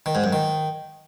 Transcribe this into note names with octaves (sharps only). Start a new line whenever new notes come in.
D#3
G#2
F#2
D#3